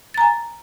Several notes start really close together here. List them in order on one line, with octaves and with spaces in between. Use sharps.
A6 A#5 G#5